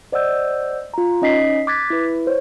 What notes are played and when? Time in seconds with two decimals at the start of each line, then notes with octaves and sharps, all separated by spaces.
0.12 C5 D5 D#5 F#5 E6 G6
0.94 F4 A#5
1.22 C#4 D#4 D#5 G#5 B6 C7
1.67 D6 F#6 G#6 A6 B6
1.90 E4 B4
2.27 C5 C#5